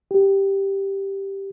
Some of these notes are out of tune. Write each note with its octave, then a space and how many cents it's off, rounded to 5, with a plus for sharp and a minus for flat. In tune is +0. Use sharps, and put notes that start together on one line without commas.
G4 +0